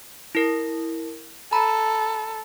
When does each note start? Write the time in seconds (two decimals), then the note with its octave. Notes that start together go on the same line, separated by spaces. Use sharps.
0.35 E4 A#4 A#6
1.53 A4 A#5 B5